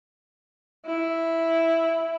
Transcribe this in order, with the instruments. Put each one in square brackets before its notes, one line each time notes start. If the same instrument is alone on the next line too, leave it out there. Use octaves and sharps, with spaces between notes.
[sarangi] E4